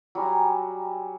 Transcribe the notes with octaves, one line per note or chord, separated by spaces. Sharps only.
F#3 G3 G#5 A#5